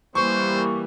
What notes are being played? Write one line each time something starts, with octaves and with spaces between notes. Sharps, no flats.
E3 G3 A#3 C5 C#6